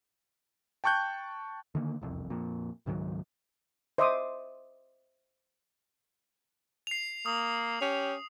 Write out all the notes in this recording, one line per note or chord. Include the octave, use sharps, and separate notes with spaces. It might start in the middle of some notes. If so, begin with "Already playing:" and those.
G5 A5 C#6 F#6 G6
D3 D#3 A#3
E1 C2 F2
F2 A#2
C#2 G#2 D#3 F#3
C5 D#5 E5 C6 D6 D#6
C7 F7
A#3 D#6
C#4 G4